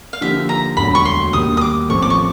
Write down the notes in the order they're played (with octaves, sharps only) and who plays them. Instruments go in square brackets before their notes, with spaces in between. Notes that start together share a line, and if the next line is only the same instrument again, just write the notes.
[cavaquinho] F5
[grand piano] D3 F3 A#3 D#4 G4 [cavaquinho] E5
[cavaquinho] A#5
[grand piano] E1 D2 D3 F#3 [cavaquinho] B5
[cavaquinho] C#6
C6
[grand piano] D#2 D#3 G3 A#3 D#4 [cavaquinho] D#6
[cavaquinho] D#6
D6
[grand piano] A1 A2 F3 A3 C4 [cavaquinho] C#6
[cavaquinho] D6
C#6